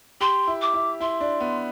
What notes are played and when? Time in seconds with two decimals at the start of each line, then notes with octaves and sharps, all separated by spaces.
0.20 G4 C6
0.47 E4
0.61 D6
0.74 E4
1.00 E4 C6
1.21 D4
1.41 B3